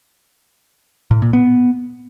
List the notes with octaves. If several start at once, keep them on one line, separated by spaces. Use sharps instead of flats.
A2
A#2
B3